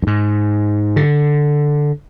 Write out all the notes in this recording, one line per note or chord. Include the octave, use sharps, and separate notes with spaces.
F#2
G#2
D3